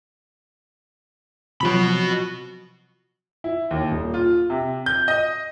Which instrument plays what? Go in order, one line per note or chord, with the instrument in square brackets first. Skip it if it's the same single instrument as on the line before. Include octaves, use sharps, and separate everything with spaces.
[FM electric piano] C3 F3 F#3 [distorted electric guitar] F#4 B5
[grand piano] E4
D#2
D#1
F4
C3
G6
D#5